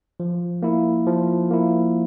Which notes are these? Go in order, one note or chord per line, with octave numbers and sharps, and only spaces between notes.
F3
A#3 E4
F3
A#3 E4